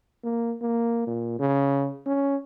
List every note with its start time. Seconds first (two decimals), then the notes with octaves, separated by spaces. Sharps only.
0.23 A#3
0.61 A#3
1.07 A#2
1.39 C#3
2.06 C#4